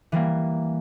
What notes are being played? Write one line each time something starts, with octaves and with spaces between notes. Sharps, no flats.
E3 G3 A#3